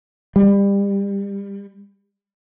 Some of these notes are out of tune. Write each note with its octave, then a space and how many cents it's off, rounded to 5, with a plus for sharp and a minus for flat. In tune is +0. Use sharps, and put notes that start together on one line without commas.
G3 +25